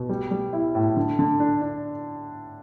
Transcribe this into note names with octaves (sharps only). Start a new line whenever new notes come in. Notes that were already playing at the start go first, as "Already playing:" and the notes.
Already playing: B2
G3
G3
E4
A2
D3
D3
D4
D4